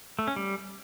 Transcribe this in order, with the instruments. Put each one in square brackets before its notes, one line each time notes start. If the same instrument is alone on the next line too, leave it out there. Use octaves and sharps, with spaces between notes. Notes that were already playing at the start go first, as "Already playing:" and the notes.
[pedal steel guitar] A3
C#4
G3